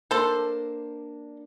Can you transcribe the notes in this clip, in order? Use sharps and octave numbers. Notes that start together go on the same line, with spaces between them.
A#3 D4 A4 C5